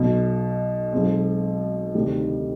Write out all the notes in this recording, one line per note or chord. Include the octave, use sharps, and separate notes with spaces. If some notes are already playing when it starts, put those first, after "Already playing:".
Already playing: B1 B2 B3
B1 B2 G#3 C4
D2 C3 D#3 G3 C4